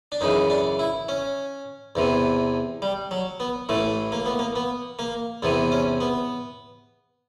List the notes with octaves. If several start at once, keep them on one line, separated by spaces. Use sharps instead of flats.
D4
F#2 C#3 E3 D#4
D4
E4
C#4
E2 C3 E3
G3
F#3
B3
A1 A2 E3 A3
A#3
B3
A#3
B3
A#3
E2 C3 E3 B3
C#4
B3